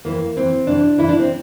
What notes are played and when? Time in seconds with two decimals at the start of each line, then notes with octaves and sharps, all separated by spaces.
0.05 F2 E3 A#3
0.37 F2 E3 C4
0.67 F2 C3 E3 D4
0.98 F2 C3 E3 E4
1.09 D4
1.20 C4